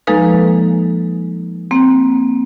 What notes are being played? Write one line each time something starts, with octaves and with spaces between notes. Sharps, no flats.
F3 G#3 A#3 D#4 A4 B4
A#3 C4